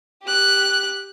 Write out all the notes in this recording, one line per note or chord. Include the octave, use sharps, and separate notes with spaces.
G4 F#6